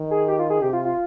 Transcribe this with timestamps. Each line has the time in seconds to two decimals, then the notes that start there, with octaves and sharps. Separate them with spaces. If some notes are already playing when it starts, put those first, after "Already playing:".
Already playing: D#3
0.11 G#4
0.28 G4
0.39 F4
0.50 G#4
0.62 C3 G4
0.73 F4
0.85 F4